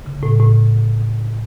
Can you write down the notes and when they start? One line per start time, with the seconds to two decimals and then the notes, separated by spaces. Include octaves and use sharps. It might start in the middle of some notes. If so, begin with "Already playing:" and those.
0.06 C#3
0.23 A2
0.40 A2